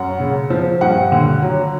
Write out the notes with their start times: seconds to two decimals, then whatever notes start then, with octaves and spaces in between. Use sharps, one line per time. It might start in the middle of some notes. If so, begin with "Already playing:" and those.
Already playing: F#2 F#5
0.20 C#3
0.50 F3
0.81 G2 F#5
1.12 D3
1.42 F#3